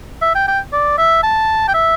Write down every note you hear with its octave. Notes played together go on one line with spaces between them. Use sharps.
E5
G5
G5
D5
E5
A5
G5
E5